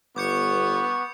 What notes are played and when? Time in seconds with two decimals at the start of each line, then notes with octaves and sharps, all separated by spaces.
0.16 G1 B3 C#6 D6 G6 C#7